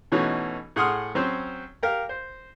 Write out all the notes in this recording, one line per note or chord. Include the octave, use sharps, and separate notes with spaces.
B2 E3 A3 C#4 D#4 F#4
A2 G#4 F#5 C6 D#6 F6
F#3 C4 C#4 C5
G4 A#4 F5
C5